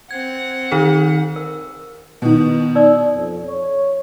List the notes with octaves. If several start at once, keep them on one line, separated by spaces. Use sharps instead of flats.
C4 F#5 G#6
D#3 D#4 A4
A#4
B2 D#3
D#4 D5 E6
F2
C#5